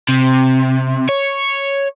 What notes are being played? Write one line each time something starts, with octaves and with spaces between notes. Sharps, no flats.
C3
C#5